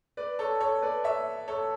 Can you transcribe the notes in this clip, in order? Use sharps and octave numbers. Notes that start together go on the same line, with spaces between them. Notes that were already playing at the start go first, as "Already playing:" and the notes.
B4 D5
A4 C#5
A4 C#5
B4 D5
C#5 E5
A4 C#5